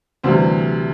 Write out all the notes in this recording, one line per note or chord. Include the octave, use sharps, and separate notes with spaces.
D2 C3 E3 G3 C5